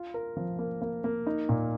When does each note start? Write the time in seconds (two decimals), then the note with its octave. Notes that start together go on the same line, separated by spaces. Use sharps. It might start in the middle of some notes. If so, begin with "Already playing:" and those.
Already playing: F4
0.14 A#4
0.37 F3
0.59 A#3
0.82 A#3
1.04 A#3
1.27 D#4
1.49 A#2